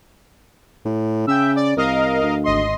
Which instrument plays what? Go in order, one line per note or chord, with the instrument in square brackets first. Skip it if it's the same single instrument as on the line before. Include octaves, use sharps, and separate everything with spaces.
[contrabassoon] A2
[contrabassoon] C#3 [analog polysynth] E5 G5
[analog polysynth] D5
[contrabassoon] C2 [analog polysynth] A#4 D#5 F5
[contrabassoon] D2
[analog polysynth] G#1 D#5 C6